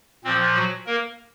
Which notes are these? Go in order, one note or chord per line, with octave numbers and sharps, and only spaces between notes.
A#2 F3 C4
F#3 F#4
A#3 A#4